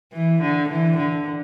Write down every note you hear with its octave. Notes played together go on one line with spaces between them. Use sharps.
E3
D3
E3
D3